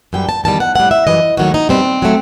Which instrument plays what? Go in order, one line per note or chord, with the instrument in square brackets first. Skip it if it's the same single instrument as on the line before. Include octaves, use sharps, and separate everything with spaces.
[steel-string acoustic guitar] F#2 E3 G3 G5
A5
E2 D#3 G3 A5
F#5
A2 G3 F#5
E5
F#2 E3 G3 D#5
D#2 D#3 F#3 A3 F#4
D#4
B2 G3 C4
F#3 A3